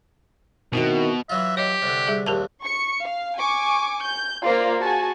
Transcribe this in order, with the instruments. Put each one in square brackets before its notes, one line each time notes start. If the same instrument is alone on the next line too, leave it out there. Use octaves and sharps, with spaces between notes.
[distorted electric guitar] B2 [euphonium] D#3 [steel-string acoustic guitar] C4 E4 F#4
[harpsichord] E3 F#3 F4 [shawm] E5
[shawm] G4 [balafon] C#5 D#5
[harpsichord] C2 D3
[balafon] G3 G#4
[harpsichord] A#1 D#2 [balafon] G4 A#4 A5
[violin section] C#6 C#7
F5
G#5 C#6 D6
G6
A#3 F4 C5 D5 F5
F#4 G#4 G#5 A5